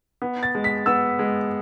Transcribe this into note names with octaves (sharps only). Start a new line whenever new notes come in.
B3
A6
G#3
B6
B3 E6
G#3